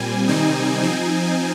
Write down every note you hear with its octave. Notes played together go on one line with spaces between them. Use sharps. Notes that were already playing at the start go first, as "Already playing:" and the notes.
Already playing: A#2 G3 C4 G#5
C3 D#3 G3 C4 D#4
F3 C4 D#4